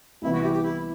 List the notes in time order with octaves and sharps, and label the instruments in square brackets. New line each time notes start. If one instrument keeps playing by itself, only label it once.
[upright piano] C2 C3 E3 B3 [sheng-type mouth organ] E4
[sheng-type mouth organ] F#4
G4
G4
E4